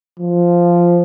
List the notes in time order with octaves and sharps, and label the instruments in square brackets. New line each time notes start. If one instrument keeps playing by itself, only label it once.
[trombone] F3